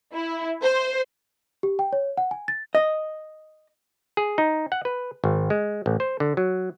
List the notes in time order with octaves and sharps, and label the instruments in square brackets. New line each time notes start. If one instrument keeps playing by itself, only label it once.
[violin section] E4
C5
[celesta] G4
G5
C#5
F#5
G#5
A6
[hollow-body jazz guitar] D#5
[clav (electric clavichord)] G#4
D#4
F#5
B4
G#1
G#3
A1
C5
D3
F#3